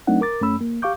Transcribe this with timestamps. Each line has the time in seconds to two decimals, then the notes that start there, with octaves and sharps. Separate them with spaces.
0.07 F#3 A3 C4 D4 D#4 F#5
0.21 A#4 D6 A6
0.41 F#2 A3 C#4 B5 E6
0.61 A#3
0.82 G4 F5 C#6 D6 G6